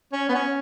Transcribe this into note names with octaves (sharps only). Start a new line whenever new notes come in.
C#4
B3
C#4